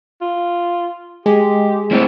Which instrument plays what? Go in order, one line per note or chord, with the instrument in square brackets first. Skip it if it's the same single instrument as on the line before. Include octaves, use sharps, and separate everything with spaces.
[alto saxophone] F4
[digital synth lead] G#3 [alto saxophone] G4
[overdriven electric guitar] A2 C4